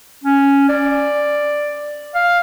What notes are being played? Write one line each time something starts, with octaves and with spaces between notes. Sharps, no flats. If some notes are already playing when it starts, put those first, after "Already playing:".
C#4
D5
F5